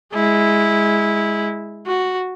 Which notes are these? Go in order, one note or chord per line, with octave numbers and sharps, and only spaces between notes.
G#3 E4
F#4